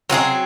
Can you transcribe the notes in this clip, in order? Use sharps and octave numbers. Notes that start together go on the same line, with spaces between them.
F#3 C4 F4 G#4